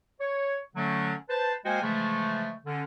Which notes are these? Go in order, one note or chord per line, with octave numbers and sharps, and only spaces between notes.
C#5
D3 F#3 A3 C#4
B4 C5 A5
G#3 A#3 F#4 C5 G5 G#5
C#3 E3 F3 G#3 A3
D3 C#4